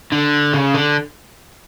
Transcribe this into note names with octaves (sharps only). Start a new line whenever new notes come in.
D3
C#3
D3